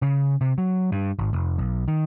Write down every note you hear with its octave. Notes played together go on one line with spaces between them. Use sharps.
C#3
C3
F#3
G2
G#1
F1
B1
D#3